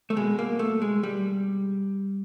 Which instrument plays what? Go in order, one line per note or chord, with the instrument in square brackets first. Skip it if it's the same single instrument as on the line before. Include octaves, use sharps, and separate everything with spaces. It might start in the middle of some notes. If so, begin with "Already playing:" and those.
[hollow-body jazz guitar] A3
B2 G#3
A#3
A3
G#3
G3